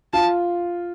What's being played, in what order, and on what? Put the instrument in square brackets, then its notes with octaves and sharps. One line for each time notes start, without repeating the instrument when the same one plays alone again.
[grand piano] F4 [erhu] A5